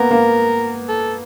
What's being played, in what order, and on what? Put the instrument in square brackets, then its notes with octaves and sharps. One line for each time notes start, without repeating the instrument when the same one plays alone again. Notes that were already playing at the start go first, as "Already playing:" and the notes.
Already playing: [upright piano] A#3 B3 [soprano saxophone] A#4
[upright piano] A#3
[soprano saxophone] A4